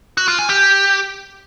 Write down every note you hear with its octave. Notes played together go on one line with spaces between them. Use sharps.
F#4
F4
G#5
G4